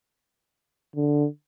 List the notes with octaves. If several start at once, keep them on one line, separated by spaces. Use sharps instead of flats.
D3